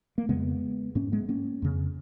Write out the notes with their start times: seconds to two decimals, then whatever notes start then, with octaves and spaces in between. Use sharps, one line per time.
0.18 A#3
0.29 F2 C#3 G#3 B3
0.95 G#2 A#3 C#4
1.12 G#3 B3
1.29 A#3 C#4
1.62 F2 C#3